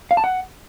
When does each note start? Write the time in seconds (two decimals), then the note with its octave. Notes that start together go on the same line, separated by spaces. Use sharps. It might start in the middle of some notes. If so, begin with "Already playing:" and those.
0.11 F5
0.17 A5
0.24 F#5